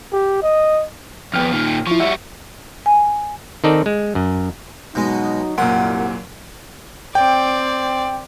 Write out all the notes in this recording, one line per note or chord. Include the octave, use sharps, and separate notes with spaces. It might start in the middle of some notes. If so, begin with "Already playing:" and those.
G4
D#5
F2 B3 G5 F6
A#2 D#3
F3 E4 C#6
G3 F#4 E5
G#5
D#3 C4 D#4 A4 D5
G#3
F#2
B2 F#3 G#3 D#4
C2 F#2 A#2 F#5
C4 D5 G5